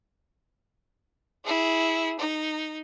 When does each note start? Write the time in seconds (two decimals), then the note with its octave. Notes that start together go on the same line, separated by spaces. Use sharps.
1.45 E4 G#4
2.19 D#4